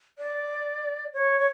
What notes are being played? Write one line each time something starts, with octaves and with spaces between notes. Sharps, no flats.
D5
C#5
C#5